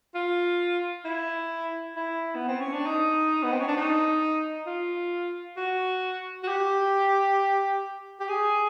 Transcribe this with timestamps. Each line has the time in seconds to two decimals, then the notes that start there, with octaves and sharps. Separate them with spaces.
0.15 F4
1.05 E4
1.96 E4
2.35 B3
2.48 C4
2.60 C#4
2.73 D4
2.86 D#4
3.43 B3
3.51 C4
3.60 C#4
3.68 D4
3.77 D#4
4.67 F4
5.57 F#4
6.43 F#4
6.48 G4
8.20 G4
8.29 G#4